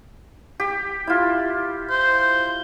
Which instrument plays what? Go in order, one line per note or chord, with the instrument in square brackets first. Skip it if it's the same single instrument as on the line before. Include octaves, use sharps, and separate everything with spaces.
[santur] G4
E4 F4
[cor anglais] C5